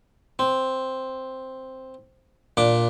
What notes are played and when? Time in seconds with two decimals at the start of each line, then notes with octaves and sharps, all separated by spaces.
0.39 C4
2.57 A#2 D4 D6